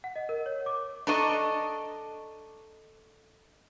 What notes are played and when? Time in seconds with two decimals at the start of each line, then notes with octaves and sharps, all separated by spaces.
0.04 F#5
0.16 D#5
0.29 A#4
0.46 C#5
0.66 D6
1.07 D4 A4 D#5 A#5 C#6